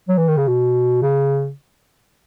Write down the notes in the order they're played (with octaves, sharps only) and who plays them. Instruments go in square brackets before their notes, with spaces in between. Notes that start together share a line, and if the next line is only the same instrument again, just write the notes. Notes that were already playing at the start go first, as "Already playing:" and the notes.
[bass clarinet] F#3
E3
D#3
C#3
B2
C#3